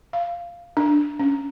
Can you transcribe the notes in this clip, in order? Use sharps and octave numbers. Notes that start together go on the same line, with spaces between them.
F5
D4
C#4